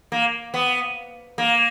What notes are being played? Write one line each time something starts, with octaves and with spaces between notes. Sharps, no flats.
A#3
B3
A#3